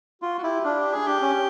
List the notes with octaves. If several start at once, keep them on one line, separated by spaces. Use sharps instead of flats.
F4 F#4
F#4
E4 G4
D4 F4
G4
G#4
D4 G4
C#4